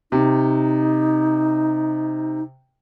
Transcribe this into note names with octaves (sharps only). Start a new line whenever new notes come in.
C3 D#4